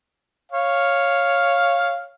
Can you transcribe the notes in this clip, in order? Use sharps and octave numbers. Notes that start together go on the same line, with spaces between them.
C#5 F5